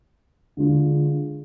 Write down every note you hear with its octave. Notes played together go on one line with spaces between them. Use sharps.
D3 G#3 D4 F4